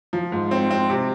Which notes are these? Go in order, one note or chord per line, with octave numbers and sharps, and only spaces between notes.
F3
G#2
C4
C4
C3